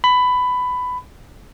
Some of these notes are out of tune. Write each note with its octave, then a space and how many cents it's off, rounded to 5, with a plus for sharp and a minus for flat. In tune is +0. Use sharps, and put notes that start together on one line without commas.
B5 +15